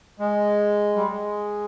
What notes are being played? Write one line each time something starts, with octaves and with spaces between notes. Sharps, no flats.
G#3
G3
G#3